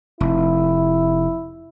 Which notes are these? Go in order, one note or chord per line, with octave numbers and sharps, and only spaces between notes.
F1 E4